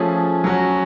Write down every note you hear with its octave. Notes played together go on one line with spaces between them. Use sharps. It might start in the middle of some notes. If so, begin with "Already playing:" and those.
Already playing: F3 A3 C#4 G#4
F#3 C#4 F#4